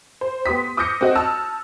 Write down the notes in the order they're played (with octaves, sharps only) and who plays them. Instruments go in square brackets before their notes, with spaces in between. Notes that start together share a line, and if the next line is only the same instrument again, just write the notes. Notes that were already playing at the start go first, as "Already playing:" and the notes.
[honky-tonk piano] C5
B3 G4 C6 D#6 B6
D6 D#6 F6 G6 A#6 C#7
C4 F#4 D#5
A5 E6 F6